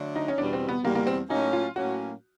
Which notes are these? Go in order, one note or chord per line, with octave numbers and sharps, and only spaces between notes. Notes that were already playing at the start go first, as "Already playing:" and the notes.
Already playing: D3 F#3 A3 D4
D#4
C#4
E2 B2 G3 D4
C4
B3
E2 B2 G3 A#3
A#3
C4
A2 F#3 A#3 C#4 D#4
F4
A2 F#3 A#3 C#4 F#4